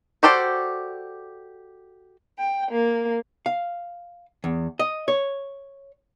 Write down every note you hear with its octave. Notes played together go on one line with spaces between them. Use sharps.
F#4 G4 A4 C5 D5
G5
A#3
F5
E2
D#5
C#5